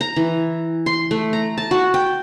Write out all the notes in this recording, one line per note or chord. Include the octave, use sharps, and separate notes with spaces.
A#5
E3
C6
A3
A#5
A5
F#4
G5